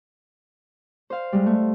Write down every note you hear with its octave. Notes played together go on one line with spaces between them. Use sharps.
C5 F5
G3 G#3
A3